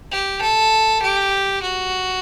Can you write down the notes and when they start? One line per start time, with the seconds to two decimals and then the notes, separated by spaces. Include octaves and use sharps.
0.12 G4
0.42 A4
1.02 G4
1.63 F#4